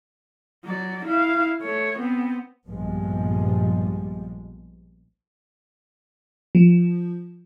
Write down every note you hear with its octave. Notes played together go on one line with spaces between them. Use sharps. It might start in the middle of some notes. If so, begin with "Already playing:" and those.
F#3 D5
E4 F5
A3 C#5
B3 C4
A#1 G2 B2 F3 G3 G#3
F3